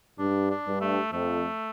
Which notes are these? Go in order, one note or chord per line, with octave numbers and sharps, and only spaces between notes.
G2 D4
D4
G2
A3
F2 A3